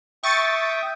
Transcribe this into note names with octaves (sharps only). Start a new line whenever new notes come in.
E5 G5 C#6 D#6 A6